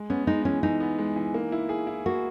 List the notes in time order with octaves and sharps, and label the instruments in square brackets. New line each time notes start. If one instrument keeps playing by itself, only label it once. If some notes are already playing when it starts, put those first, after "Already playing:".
Already playing: [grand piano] G#3
[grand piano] B3 [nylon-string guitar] C#4
[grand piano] G#3 [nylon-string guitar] D#4
[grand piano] E3 [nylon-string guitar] C#4
[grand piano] E3 [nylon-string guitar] D#4
[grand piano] B3
G#3
E3
A#3
E4
G#4
E4
[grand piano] A#3 [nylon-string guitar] F#4